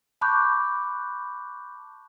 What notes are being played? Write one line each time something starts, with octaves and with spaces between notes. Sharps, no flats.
A5 B5 C#6 D6 F#6 G6